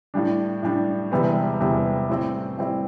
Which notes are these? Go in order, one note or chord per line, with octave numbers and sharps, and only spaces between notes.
A2 G3 D4
A2 G3 D4
E1 E2 C3 G3 B3
E1 E2 C3 G3 B3
A2 G3 C4 E4
A2 G3 C4 E4